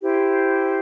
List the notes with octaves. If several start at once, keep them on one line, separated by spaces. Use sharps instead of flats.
E4 G4 C5